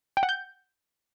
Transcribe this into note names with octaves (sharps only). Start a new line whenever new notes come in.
G5
F#5
G6